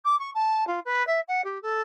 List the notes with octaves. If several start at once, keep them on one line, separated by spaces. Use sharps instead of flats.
D6
C#6
A5
F4
B4
E5
F#5
G4
A4